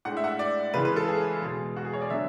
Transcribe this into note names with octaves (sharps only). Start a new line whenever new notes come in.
A2 G#3 D4 F#5
E5
F#5
E5
D5
C#3 E3 G#3 B4
B4
A4
G#4
E2 B2 G#3
F#4
G#4
C#5
D5
D3 F#3 B3 D4 E5